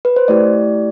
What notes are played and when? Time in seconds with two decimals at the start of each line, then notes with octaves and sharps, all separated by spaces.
0.05 B4
0.16 C5
0.28 A3 E4 G4 D5